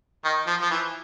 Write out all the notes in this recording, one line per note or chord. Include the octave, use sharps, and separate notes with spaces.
D#3
F3
F3
E3